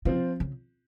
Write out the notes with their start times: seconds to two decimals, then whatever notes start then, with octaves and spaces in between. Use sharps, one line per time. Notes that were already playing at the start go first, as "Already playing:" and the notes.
0.05 C#3 F3 C4 F4
0.40 C#3